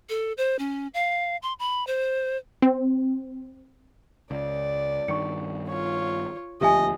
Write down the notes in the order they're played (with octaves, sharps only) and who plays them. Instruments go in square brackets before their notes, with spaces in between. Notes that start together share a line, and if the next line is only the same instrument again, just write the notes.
[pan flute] A4
C5
C#4
F5
C6
B5
C5
[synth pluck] C4
[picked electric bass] C#2 [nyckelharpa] D5
[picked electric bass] G2 D#3 [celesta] C#6 C#7
[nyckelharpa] F4 C#5
[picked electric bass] D#1 D2 F3 [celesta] G4 E5 G#5 [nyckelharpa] D#5